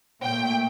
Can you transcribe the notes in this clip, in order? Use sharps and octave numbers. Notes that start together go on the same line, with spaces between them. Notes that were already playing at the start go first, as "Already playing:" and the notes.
A#2 A3 G5